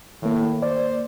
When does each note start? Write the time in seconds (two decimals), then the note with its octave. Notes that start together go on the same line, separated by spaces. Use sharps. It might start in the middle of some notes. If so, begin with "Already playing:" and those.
0.22 A2 D#3 A#3
0.62 C5 D5